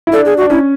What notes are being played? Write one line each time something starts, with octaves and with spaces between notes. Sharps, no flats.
E4
D4 A4
G#4
F#4
D4
C#4 E4